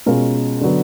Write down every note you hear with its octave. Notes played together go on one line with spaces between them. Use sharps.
B2 G#3 C#4 F4 A#4
D3 F#3 B3